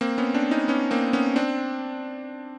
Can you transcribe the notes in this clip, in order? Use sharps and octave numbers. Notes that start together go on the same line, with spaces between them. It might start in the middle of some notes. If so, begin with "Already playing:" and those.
A#3 C4
B3 C#4
C4 D4
C#4 D#4
B3 C#4
A#3 C4
B3 C#4
C4 D4